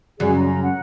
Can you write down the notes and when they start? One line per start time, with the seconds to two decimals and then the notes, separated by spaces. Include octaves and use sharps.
0.20 F#2 C#3 G3 F#4 G#4 D5
0.35 C#4 A#5
0.62 F#5